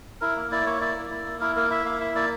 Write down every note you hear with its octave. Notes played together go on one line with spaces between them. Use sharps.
E4 A#4
A#3
E4 D5
A#3 C#5
E4 D5
A#3
E4
A#3
E4 A#4
A#3 A#4
E4 E5
A#3 F5
E4 E5
A#3 D5